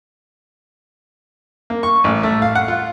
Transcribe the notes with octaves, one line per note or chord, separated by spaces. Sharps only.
A#3
C#6
A1
A3
F5
F#5
F4